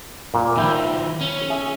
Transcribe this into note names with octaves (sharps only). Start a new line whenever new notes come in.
A#2
D#3 F3 E4 G5
C#4
G#4 E5